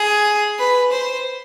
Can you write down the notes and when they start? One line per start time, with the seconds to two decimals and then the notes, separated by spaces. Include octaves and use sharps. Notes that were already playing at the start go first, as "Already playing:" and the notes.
Already playing: G#4
0.59 B4
0.93 C5